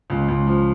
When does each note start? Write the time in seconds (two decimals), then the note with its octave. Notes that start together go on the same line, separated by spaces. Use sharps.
0.10 C#2
0.28 C#2
0.47 F3